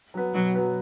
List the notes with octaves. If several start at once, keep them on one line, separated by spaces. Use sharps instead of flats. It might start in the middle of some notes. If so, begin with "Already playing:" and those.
F#3 B3
B2 F#3
F#3 B3